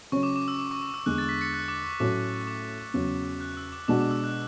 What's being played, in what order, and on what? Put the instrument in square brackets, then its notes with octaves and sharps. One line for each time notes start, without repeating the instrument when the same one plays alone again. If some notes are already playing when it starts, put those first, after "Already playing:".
[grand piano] C#3 F#3 C#4 [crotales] C#6
[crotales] D6
D6
E6
D6
C#6
C#6
E6
[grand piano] E2 D3 G#3 [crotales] F#6
[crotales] A6
B6
A6 C#7
F#6
D6
C#6
[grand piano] A2 F#3 A3 C#4 F#4 [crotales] D6
[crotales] D6
[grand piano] E2 C#3 F#3
[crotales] F#6
E6
D6
[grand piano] B2 G#3 D4 F#4 [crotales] D6
[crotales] D6
E6
F#6